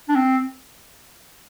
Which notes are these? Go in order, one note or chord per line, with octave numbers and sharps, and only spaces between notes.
D4
C4